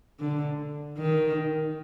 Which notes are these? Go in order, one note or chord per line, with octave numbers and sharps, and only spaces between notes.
D3
D#3